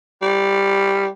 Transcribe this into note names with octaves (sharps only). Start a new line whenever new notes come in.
G3